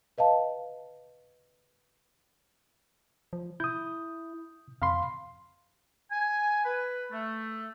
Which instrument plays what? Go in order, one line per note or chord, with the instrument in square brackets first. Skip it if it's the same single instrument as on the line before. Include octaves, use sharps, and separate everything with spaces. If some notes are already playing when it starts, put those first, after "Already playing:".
[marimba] B4 D#5 F5 A5
[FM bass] F3
[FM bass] E4 [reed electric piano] D#6 G6
[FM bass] F2 [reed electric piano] F5 B5 C6
[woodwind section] G#5
B4
A3